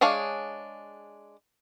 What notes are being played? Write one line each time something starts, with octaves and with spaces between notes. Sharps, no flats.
G#3 D4 G#4 C#5 F5